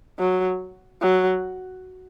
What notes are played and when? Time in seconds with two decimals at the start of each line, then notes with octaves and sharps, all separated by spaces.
0.19 F#3
1.02 F#3